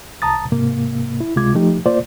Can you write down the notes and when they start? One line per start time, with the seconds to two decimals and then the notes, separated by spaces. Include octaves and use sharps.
0.22 C2 A5 A#5 D#6 A6
0.52 G#2 C3 A#3
1.20 E4
1.36 C#2 C3 G#3 F4 D6 G#6
1.55 F3 A3 D#4 G4
1.86 A#3 F4 C5 D5